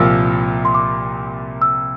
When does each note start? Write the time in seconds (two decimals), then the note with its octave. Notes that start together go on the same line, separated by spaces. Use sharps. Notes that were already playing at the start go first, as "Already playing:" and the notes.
Already playing: C2 A#2 F3 A#3 F4 E6
0.65 C6
0.75 D6
1.62 E6